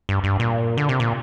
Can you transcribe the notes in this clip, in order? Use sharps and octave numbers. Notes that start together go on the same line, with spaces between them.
G2
G2
A#2
D3
C3
A#2